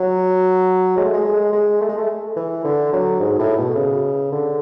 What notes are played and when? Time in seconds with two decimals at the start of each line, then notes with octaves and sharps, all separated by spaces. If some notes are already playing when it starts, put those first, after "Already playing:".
Already playing: F#3
0.97 G#3
1.05 A3
1.13 G#3
1.25 G#3
1.53 G#3
1.81 A3
1.89 G#3
1.98 A3
2.36 E3
2.65 D3
2.93 F#3
3.20 G#2
3.39 A2
3.58 B2
3.76 C#3
4.32 D3